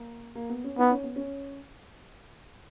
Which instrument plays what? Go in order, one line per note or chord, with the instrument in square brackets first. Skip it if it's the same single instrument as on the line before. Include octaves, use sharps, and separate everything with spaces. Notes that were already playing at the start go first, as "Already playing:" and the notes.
Already playing: [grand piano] A#3
A#3
B3
C#4
[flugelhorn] B3 [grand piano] D#4
[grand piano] C#4
B3
C#4